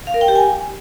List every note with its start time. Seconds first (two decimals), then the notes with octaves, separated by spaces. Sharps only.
0.07 F5
0.14 A#4
0.21 G5
0.28 G4
0.35 G#5